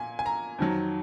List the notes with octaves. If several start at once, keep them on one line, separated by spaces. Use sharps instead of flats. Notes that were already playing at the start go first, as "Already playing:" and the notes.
Already playing: A#2 G#5
G#5
A#5
F2 D#3 F#3